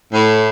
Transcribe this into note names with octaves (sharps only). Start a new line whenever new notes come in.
A2